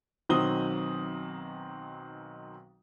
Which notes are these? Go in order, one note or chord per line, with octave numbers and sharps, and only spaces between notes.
B1 D#3 F#3 C4 D#6 G7